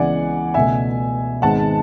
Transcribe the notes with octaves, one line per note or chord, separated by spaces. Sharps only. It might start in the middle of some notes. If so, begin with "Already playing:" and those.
Already playing: C#2 C#3 E3 G#3 B3 D5 F#5 G#5
C#2 B2 A3 E5 G#5
G#1 G#2 G#3 B3 F#5 A5